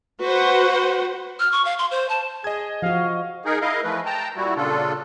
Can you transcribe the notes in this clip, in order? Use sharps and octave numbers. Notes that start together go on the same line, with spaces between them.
F#4 B4 C5 F#5
F6
C#6
F5
C6
C5
A5
G#4 D#5 G#6
F3 F#4 F5
D#4 G#4 A#4
E4 A#4 D#5 F5
E3 F3 A3 B4
G5 A5 A#5
A#2 G3 E4 F#4
A#2 C#3 D4 F4 A4